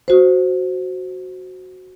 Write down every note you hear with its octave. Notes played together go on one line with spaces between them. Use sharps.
F#4 C5